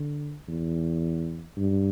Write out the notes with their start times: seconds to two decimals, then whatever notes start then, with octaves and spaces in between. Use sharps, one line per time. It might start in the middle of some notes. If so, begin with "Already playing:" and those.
Already playing: D3
0.48 E2
1.57 G2